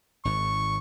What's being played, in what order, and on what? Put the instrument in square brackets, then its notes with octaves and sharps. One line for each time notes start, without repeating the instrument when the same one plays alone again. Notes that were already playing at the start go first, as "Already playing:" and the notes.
[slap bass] G#1 G#2 [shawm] C#6